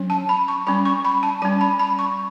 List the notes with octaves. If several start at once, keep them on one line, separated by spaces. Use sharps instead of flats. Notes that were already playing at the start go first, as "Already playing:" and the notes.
Already playing: F#3 C#4
A5
B5
C#6
G3 C#4 B5
C#6
B5
A5
G3 C#4 A5
B5
B5
C#6